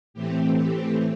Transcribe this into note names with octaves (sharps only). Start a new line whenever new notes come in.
A2 E3 A3 C4 G4
G4